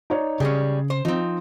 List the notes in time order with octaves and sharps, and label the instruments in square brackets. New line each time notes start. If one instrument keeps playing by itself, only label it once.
[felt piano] D#4 C#5 D5
[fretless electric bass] C#3 [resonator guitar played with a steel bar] G3 G#3 C#4 [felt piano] G#4
[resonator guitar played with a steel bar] C5
[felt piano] F3 [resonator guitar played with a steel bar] C4 D#4